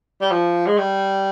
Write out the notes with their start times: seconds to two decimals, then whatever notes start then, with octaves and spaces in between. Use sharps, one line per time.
0.21 G3
0.31 F3
0.66 G#3
0.78 G3